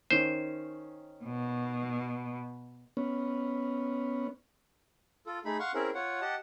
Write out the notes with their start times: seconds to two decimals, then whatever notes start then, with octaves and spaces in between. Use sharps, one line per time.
0.10 D#3 C#4 C5
1.25 B2
2.97 B3 C#4
5.27 F4 A4
5.45 A3 D#4 G#4 B5
5.60 F5 F#5 C6 C#6
5.74 C4 C#4 E4 G#4 A#4
5.95 F4 C#5 F#5
6.21 G4 D#5 F#5 A5